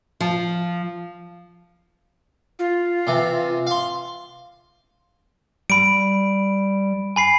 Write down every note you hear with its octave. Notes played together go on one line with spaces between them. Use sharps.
F3
F4
C3 E3
F5 C6
G3 B5 D7
G#5 B5 C7